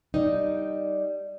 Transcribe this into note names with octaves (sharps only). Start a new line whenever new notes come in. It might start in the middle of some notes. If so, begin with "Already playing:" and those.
G3 D#4